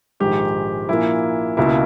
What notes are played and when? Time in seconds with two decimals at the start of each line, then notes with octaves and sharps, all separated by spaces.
0.20 A#1 G#2 D#3 G#3 G4
0.89 A#1 A#2 A#3 E4
1.57 C#2 B2 A#3 E4